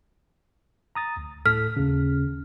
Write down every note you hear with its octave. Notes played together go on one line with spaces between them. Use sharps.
A#5 D#6 A6
D2
A2 A4 F6 B6
D#2 C#3